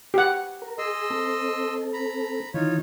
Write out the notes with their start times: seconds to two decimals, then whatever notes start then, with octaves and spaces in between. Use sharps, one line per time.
0.14 G4 F#5
0.62 A#4
0.78 G#4 D#5 C6 E6
1.10 C4 A4
1.93 A#5 B5
2.54 D#3 E3 D#4 F4 C#5